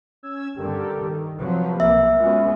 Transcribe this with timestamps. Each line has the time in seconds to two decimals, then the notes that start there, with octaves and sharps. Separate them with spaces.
0.23 C#4 E6 G#6
0.56 G2 D3 G4 A4 A#4
1.01 D#3
1.38 C3 F3 F#3 B4
1.80 B1 A#3 E5
2.20 G#3 B3 C#4 F4 F#4